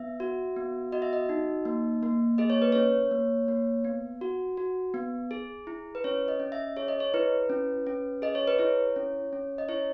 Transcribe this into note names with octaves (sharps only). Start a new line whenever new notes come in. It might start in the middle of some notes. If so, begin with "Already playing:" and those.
Already playing: B3 E5
F#4
B3
F#4 D#5
E5
D#5
D#4
A#3
A#3
G#4 D#5
C#5
B4
C#4 C#5
A#3
A#3
B3
F#4
F#4
B3
G#4
E4
B4
C#4 C#5
D#5
C#4
E5
G#4 C#5
D#5
C#5
E4 B4
C#4
C#4
G#4 D#5
C#5
B4
E4 C#5
C#4
C#4
D#5
E4 C#5